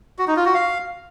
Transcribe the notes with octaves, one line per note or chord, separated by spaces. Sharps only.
F#4
D#4
F4
F#4
F5